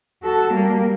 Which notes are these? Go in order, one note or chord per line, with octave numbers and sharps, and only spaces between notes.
F#4 A4
G3 A#3